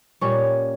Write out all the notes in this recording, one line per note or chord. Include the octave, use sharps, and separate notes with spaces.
A#2 G3 A#3 C#4 C#5